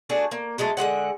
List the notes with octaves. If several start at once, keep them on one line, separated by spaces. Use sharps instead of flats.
A3 D4 F#4 G#4
A#3
F#3 G#3 A3 A4
D3 G#3 F4 F#5